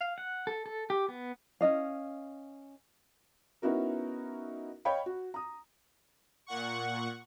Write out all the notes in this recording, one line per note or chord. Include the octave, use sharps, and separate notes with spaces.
F5
F#5
A4
A4
G4
B3
C#4 D4 D#5 F5
B3 C#4 D#4 E4 F#4 A#4
C#5 D#5 F5 G5 B5
F#4
A#5 D#6
A#2 F#5 C#6